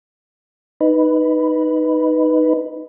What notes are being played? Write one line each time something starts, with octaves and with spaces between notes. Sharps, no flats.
D#4 B4